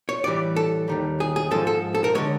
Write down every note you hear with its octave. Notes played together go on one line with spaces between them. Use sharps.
C#5
A2 E3 G3 D5
A4
D#2 D#3 G3
G#4
G#4
G#2 F3 G#3 A4
A4
A4
A#4
D3 F3 G#3 C#5